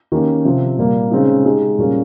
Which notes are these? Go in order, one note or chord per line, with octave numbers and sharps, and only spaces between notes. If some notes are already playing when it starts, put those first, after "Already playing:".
D#3 A#3 C#4 G4
C3 F3 C4 G4
A#2 G3 A#3
C#3 G#3 C4 D#4
G#3 D#4 G4
A#2 G3 A#3 C#4 G#4